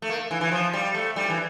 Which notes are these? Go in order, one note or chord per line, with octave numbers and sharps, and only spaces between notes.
A3
A#3
E3
E3
F3
G3
A3
G3
E3